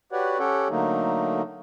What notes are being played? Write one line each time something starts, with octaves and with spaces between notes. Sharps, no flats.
F#4 G4 B4 C#5 D5 F#5
C#4 G4 A4 C#5 F#5 G5
D3 F#3 A3 A#3 D#4